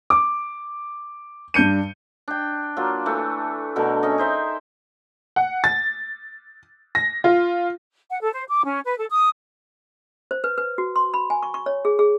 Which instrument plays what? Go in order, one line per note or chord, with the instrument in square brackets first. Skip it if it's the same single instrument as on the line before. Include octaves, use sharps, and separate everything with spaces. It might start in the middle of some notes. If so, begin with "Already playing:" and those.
[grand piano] D6
G2 D4 G6 C#7 D#7
[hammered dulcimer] D4 G5
F#3 A#3 F4
E3 A3
B2 D3 A3 A#4
C#4 G#4 D#5
D#4 C5 E5
[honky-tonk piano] F#5
A6
A#6
F4
[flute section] F#5
A4
C5
D6
C#4
B4
A4
D#6
[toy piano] C5
B4
B4
F#4
C6
B5
G#5
C#6
C#6
C#5
G#4
G#4